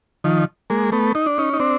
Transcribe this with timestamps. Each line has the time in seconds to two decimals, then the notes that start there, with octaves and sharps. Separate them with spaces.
0.24 D#3 F3
0.70 G#3 A#3
0.92 A3 B3
1.15 D#4
1.26 D4
1.38 C#4 D#4
1.53 D#4
1.60 C4 D4